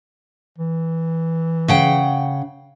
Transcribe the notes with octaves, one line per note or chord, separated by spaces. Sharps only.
E3
C#3 F#5 G5